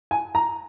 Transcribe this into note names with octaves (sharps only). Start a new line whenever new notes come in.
G#5
A#5